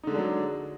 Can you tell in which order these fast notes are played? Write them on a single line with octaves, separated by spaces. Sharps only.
D#4 D3 G#3 D4 F#3